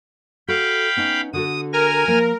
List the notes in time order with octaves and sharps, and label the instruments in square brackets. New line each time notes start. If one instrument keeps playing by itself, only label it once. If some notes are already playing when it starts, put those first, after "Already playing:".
[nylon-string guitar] F#4 A4 [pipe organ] F5 G5 B5
[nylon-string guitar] B3 C#4 D#4
[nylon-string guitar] D3 F#4 A4 [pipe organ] D#6
[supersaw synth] A#4 [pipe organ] G#5 F6
[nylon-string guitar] F3 A#3